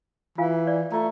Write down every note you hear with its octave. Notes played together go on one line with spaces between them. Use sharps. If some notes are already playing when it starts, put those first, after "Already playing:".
E3 F4 F5 G#5
D5
A3 F4 A#5